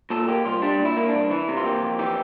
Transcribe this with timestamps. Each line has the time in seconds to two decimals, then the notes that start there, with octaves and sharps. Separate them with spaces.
0.10 A#2 A4
0.28 A#3 G4
0.45 C2 F4
0.62 G3 D4
0.79 A#2
0.85 E4
0.97 A#3
1.08 D4
1.14 C2
1.31 E3 E4
1.48 C3
1.57 F4
1.65 A#3 G4
1.83 F2
1.99 E3 G4